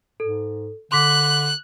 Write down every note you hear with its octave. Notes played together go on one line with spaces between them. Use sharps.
G#2 A4
D3 C6 D6 F#6 B6